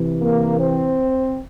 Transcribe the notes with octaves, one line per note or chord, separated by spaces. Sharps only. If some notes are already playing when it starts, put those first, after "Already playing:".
Already playing: C3 E3
A#3
C4